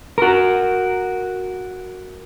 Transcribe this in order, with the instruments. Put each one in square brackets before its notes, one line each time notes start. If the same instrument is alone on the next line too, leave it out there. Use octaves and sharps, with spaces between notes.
[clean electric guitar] F#4 A#4